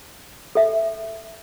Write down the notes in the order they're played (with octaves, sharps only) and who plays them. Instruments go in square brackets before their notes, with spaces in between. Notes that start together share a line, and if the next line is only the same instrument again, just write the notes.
[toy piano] A4 E5